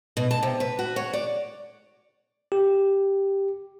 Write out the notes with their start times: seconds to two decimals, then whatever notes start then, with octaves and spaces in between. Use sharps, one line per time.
0.17 B2
0.31 A5
0.43 C3
0.60 B4
0.79 F#4
0.96 C#5
1.13 D5
2.52 G4